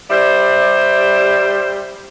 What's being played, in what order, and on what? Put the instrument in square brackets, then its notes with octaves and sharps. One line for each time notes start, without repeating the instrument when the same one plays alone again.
[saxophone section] G3 C5 D5 E5